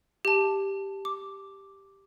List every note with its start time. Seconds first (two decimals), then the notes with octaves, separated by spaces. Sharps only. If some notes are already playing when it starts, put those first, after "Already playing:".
0.25 G4 A5
1.05 D6